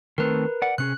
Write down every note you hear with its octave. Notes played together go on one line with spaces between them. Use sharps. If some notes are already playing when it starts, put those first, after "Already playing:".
D#3 A3 C4 A#4 B4
D5 F#5
C3 C#4 G#4 F#6